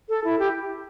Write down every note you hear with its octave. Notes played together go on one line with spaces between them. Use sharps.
A4
E4
G4